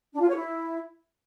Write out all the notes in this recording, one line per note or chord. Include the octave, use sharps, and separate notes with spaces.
D4
F4
C#5
E4